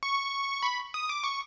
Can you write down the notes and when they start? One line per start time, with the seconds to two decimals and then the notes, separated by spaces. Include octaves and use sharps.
0.03 C#6
0.63 B5
0.94 D#6
1.09 D6
1.23 C#6